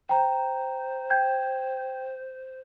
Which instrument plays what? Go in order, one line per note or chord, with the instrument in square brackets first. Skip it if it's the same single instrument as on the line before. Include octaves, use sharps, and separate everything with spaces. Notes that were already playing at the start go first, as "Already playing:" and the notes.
[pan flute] C5 [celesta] G5 A#5
[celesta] G5 G6 G#6